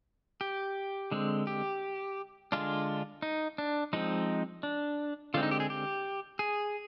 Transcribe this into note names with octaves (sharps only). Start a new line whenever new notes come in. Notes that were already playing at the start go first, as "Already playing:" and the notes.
G4
D3 G#3 C4
G4
D3 G#3 D4 F4
D#4
D4
F3 G#3 C4 D#4
D4
D3 G#3 C4 F4
D#4
G4
G#4
G4
G#4